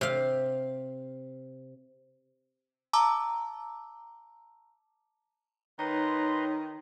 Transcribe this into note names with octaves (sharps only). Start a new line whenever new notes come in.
C3 F5
A5 A#5 D6 E6
D#3 D#4 B4 C#5 A#5 C6